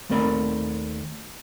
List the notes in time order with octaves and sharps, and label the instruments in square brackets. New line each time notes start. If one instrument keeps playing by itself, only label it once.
[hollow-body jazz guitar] D#2 A3 C4 A#4 D5 B5